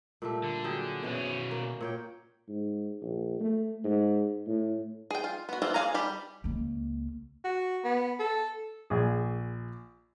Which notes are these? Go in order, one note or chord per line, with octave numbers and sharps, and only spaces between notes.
A#2 G3 A3
D3
F#3 G4 G#4
B2 E3 C#4 F#4
A#3
A#2 C#5 G5
G#2
A#1
A3
G#2
A2
G#4 G5
F4
B3 F#4
E3 C4 F4 A#4
G#4 C5 F5 G#5 A#5
G3 G4 B5
C#2 A#3
F#4
B3
A4
A#1 G#4